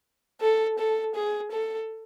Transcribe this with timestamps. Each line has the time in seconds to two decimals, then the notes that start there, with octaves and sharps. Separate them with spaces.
0.41 A4
0.79 A4
1.15 G#4
1.52 A4